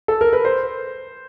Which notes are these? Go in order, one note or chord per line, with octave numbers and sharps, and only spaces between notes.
A4
A#4
B4
C5